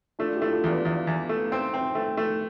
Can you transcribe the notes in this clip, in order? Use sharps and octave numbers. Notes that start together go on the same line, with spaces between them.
A3 D4 F4
E4 G4
A3
F4 A4
E2
B4 D5
E2 D5 F5
E2
A3
C4 E5 G5
C4 E5 G5
A3 E5 G5
A3